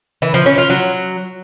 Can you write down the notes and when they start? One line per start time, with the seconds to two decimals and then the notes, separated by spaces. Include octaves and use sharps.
0.22 E3
0.34 F3
0.46 C#4
0.58 F4
0.70 F#3